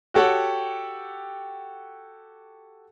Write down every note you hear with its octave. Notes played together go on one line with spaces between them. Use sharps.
F#4 G4 A4 C#5 F#5 G5